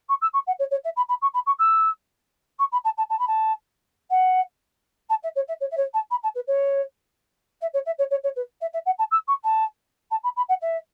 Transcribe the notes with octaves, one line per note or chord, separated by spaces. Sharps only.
C#6
E6
C#6
F#5
C#5
C#5
E5
B5
B5
C#6
B5
C#6
E6
C#6
B5
A5
A5
A5
B5
A5
F#5
A5
E5
C#5
E5
C#5
E5
C#5
A5
B5
A5
B4
C#5
E5
C#5
E5
C#5
C#5
C#5
B4
E5
E5
F#5
A5
E6
C#6
A5
A5
B5
B5
F#5
E5